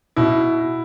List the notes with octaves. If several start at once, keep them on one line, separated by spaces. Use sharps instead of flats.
B2 E4